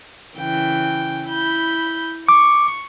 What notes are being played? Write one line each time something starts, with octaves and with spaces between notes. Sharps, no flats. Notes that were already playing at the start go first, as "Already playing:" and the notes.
C#3 E3 G5
E4 B5 G6
C#6 D6